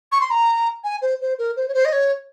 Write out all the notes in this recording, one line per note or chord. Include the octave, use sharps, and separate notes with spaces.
C#6
C6
A#5
G#5
C5
C5
A#4
C5
C#5
C5
D#5
C#5